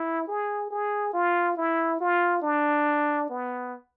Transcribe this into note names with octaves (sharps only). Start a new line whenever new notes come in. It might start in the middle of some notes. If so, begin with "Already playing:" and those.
Already playing: E4
G#4
G#4
F4
E4
F4
D4
B3